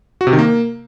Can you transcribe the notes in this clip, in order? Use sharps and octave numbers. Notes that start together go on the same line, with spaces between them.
F#4
C3
D#3
A#3